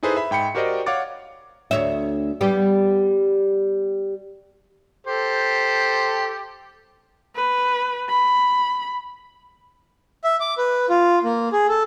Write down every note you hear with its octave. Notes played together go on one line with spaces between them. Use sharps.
D#4 E4 G#4 A4 B4 C5
E5 B5
G#2 G5 B5 C#7
F#4 G4 A#4 C5 D5 D#5
C#5 F5 F#5 D6 A6
D2 C#5 E5
G3 B3 G4
G4 A4 C5
B4
B5
E5
D6
B4
F4
A#3
G#4
A4